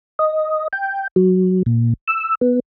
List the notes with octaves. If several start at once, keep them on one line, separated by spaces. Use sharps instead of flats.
D#5
G5
F#3
A#2
E6
B3